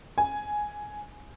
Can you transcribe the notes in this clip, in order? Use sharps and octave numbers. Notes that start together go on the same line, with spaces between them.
G#5